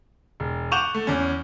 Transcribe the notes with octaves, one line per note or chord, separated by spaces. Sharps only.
E1
F#5 C#6 D6 G6 E7 F7
A3
E2 C#4